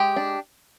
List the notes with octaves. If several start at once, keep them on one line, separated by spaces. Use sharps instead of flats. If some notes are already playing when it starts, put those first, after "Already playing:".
Already playing: G#3 G4
D4